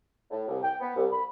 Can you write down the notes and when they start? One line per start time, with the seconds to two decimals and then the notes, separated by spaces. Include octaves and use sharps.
0.31 A2
0.48 C2
0.63 G5
0.80 B3
0.95 C2
1.12 B5